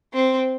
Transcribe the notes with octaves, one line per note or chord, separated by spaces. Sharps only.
C4